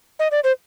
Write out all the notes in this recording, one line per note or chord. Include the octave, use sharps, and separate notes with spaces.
D#5
D5
C5